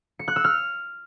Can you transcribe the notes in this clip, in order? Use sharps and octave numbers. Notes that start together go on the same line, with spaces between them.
C#7
F#6
E6
F6